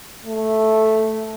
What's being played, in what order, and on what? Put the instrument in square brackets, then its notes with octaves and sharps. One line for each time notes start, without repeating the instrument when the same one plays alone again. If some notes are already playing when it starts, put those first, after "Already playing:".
[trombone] A3